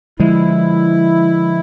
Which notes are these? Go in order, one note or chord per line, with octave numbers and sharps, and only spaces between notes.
D3 F3 G#3 E4